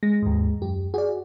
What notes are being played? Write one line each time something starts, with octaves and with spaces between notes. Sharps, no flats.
G#3 A#6
D#2 G#2
F#2 G4
F#4 G#4 D5